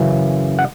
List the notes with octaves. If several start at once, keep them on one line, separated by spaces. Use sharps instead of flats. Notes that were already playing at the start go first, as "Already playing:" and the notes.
Already playing: F#2 C#3 E3
F#5